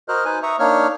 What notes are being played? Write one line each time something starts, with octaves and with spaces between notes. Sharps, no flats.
F#4 A#4 C5 D#5 F6 F#6
D#4 B4 C5 G#5 F#6
E5 A#5 C#6 D#6
A#3 D4 D#4 C#5 F6